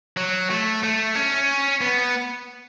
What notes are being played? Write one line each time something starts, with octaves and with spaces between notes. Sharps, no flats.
F#3
A3
A3
C#4
B3